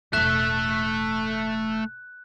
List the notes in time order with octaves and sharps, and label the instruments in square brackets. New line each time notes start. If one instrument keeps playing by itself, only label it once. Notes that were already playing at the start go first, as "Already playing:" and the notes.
[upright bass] E1 A2 [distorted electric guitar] A3 E5 [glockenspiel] F#6